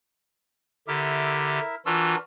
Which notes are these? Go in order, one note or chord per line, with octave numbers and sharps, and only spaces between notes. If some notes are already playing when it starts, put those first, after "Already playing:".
D3 E4 G4 A#4 E5
E3 D4 F4 F#4 A#4 E6